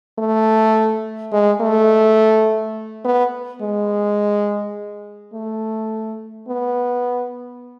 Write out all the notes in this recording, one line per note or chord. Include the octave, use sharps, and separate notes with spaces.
A3
G#3
A3
B3
G#3
A3
B3